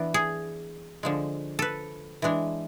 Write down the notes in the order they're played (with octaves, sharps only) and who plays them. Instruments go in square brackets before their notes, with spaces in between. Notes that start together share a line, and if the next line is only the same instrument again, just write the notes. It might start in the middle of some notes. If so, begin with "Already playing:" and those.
Already playing: [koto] E3 B3 D4
G#4
D3 F3 G#3
A4 B4
E3 G#3 D4